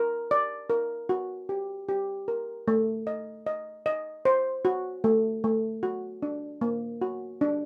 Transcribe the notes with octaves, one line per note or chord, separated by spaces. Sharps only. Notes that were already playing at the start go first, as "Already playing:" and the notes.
Already playing: A#4
D5
A#4
F#4
G4
G4
A#4
A3
D#5
D#5
D#5
C5
F#4
A3
A3
F#4
D4
A#3
F#4
D4